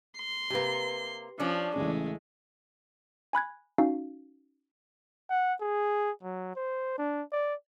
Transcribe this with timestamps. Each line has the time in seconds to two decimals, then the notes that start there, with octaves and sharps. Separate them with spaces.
0.18 C6
0.50 C3 A#3 G4 B4
1.40 F3 C#4 D4
1.76 A1 C#3 G#3 A3
3.33 G#5 B5 F#6 G#6
3.78 C#4 D#4 F#4 F5
5.30 F#5
5.61 G#4
6.23 F#3
6.56 C5
6.98 D4
7.32 D5